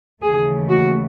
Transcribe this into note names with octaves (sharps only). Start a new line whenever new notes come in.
D#2 C#3 E3 A3 G#4
F#4